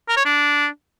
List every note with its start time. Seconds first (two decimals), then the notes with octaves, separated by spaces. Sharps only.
0.09 A#4
0.17 C#5
0.25 D4